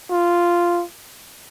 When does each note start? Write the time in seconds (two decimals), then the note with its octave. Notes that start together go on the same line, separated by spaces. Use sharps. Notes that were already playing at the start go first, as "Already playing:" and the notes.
0.11 F4